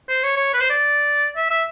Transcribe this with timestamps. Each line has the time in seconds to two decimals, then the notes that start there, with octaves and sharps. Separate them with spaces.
0.09 C5
0.23 C#5
0.36 C#5
0.54 B4
0.61 C5
0.70 D5
1.37 E5
1.51 E5